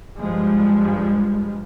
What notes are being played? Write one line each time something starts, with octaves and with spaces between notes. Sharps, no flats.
G2 F3 G3 G#3